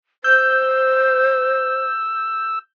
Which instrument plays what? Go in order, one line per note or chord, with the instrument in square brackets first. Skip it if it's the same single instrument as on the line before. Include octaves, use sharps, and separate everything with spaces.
[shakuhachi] C5 [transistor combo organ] E6 [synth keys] G6